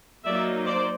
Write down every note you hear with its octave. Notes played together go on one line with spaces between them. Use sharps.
F#3 A#3 D#4 D5 E5
C5 D5